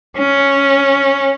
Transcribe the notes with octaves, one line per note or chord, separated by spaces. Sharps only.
C#4